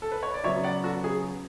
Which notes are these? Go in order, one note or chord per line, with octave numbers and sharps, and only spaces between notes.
A4
B4
C#5
D5
C#3 F#3 B3 C#5 E5
D5 F#5
F#4 A4
G#4